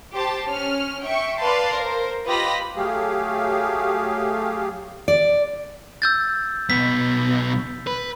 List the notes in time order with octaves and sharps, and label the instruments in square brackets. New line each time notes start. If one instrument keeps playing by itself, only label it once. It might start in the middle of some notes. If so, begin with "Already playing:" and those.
[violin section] G4 C5 A5
C#4 F6
E5 G5 C#6
B4 D5 F5 A5 C6
A#4 C5
F4 G4 B4 D#5 B5 A#6
[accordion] F#3 A3 G4 G#4 F5
[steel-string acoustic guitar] D5
[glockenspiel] E6 G6 A6
[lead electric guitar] B1 B3 [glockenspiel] B6
[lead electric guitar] B4